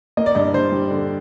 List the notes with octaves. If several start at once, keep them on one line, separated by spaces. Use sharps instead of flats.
A#3 D#5
D5
G2 D#5
G2 C5
G3
D3